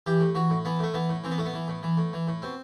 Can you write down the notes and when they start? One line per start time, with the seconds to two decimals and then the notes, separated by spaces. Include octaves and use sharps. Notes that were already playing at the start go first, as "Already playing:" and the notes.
0.06 E3 G4
0.20 A2
0.35 E3 F#4
0.50 A2
0.65 E3 B3
0.79 A2 A3
0.94 E3 B3
1.10 A2
1.24 E3 C4
1.31 B3
1.38 A2 A3
1.46 B3
1.54 E3
1.68 A2
1.83 E3
1.98 A2
2.13 E3
2.28 A2
2.42 B2 C4